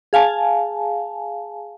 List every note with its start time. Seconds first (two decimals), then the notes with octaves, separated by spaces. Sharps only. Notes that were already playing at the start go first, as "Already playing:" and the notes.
0.13 G#4 F5 G#5 A5